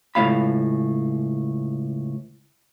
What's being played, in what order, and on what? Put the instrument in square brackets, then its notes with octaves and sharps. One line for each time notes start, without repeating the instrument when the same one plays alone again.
[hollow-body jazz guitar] C#2 A2 A#3 F5 B5